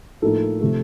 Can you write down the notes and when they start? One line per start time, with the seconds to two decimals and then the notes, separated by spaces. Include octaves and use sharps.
0.22 A2 F3 A#3 D#4 A4
0.61 C3 F3 A3